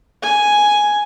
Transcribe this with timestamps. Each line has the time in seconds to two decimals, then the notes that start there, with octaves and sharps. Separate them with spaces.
0.23 G#5